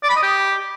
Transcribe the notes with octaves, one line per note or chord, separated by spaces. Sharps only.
D5
B5
D#5
G4